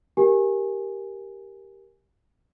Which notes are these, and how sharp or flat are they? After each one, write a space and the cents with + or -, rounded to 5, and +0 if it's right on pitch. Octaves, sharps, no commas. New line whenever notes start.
G4 +0 A#4 +0 G#5 +0